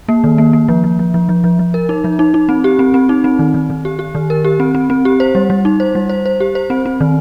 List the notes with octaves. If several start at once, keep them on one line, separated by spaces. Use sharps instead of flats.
A#3
D#3
A#3
A#3
F3
F3
F3
F3
F3
F3
F3
A#4
D#4
F3
D#4
D#4
C4
G4
C4
C4
D#4
C4
D#3
D#3
D#3
G4
G4
D#3
A#4
G4
C4
C4
C4
G4
C5
G3
G3
D#4
C5
G3
C5
C5
G4
C5
C4
C4
D#3